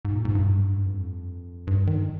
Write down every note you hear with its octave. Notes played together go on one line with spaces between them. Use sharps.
G#2
A#2
G#2
G2
F2
G2
D#3